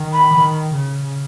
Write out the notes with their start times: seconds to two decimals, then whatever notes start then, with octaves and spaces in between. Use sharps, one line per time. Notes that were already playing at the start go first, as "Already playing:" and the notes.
Already playing: D#3
0.13 B5
0.34 D#3
0.76 C#3